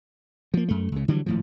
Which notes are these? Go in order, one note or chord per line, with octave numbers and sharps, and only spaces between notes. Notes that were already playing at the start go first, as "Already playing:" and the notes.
F3 A#3
F#2 A3
C#2 C#3
D3 E3 F#3 G3
G#1 A2 F3